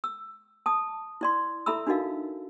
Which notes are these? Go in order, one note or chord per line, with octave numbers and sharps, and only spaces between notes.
E6
A5 D#6
E4 D5 C6
E4 A4 E5 A#5 B5 E6
D4 D#4 F#4 A#4 D#5 F5